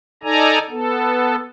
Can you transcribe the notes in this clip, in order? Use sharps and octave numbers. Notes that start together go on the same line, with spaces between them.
D#4 A4 D5 G#5 A#5
B3 A4